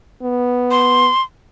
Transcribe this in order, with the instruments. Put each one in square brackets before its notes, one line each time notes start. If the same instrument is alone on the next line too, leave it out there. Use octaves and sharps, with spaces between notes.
[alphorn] B3
[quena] C6